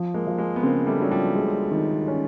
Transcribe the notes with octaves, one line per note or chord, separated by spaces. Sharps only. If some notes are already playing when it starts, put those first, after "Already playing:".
Already playing: F3
G#3 A#3
F3
G#3 A#3
B3
C#3 A#3 C4
G3 A3
F#3 D4
F3 G3
G#3
D#3
C#4